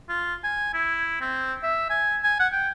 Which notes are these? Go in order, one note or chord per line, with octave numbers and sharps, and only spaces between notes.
F4
G#5
E4
C4
E5
G#5
G#5
F#5
G5